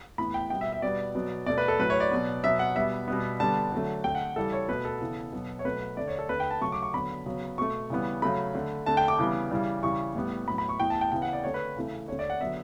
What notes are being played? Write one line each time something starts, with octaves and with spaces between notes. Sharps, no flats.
A2 E3 B3 B5
G5
B2 G3 B3 G5
E5
E5
B2 G3 B3 D5
B2 F#3 B3
B2 A3 D5
B4
A4
A2 F#3 A3 B4
C#5
D5
B2 F#3 B3
B2 F#3 B3 E5
F#5
B2 G3 B3 E5
B2 G3 B3
D3 G3 B3 A5
D3 F#3 A3
D3 A3 G5
F#5
C#3 E3 G3 A4
C#5
B2 A3 B4
A4
C#3 E3 B3
B2 F#3 B3
C#5
B2 F#3 A3 B4
D3 A3 D5
C#5
A4
D3 A3 B4
G5
A5
C#3 F#3 A3 C#6
D6
C#6
D3 F#3 B3 B5
C#3 F#3 B3
B2 A3 C#6
C#3 E3 G3 B3
C#3 F#3 A3 B5
D3 A3
D3 A3 A5
G5
D6
C#3 E3 G3 B3
C#3 E3 G3
C#3 E3 G3 C#6
A2 G3 B3
A2 F#3 B3 B5
B5
C#6
A2 E3 B3 G5
A5
G5
C#3 E3 B3 G5
F#5
D5
D3 A3 C#5
B4
C#3 E3 A3
D3 A3 C#5
D5
F#5
D3 F#3 B3 E5